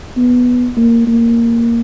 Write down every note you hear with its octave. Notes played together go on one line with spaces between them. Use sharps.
B3
A#3
A#3